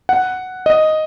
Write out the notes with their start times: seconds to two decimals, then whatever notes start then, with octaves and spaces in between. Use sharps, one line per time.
0.09 F#5
0.66 D#5